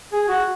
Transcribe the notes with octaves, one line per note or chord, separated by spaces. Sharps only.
G#4
F#4